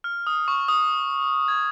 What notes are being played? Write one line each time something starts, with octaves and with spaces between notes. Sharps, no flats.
F6
D#6
C#6
D#6
G#6